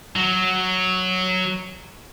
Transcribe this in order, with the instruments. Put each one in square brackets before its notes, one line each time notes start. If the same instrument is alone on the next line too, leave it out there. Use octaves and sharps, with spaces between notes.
[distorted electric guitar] F#3